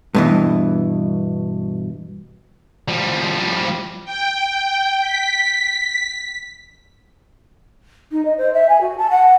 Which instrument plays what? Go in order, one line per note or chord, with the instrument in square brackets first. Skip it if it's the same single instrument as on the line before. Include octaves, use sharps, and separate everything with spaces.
[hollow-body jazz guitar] G2 B2 E3
[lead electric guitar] F3 G3
[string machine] G5
B6
[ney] D#4
D#5
C5
E5
G#5
F#4
A5
F#5